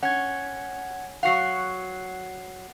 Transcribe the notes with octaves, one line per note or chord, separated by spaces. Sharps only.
C#4 F#5 G#6
F#3 F#4 F5 F#5 C7